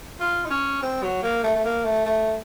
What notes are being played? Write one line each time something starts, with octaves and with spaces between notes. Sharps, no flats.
F4
D#4
C#4
C4
F#3
A#3
A3
A3
A#3
A3
A3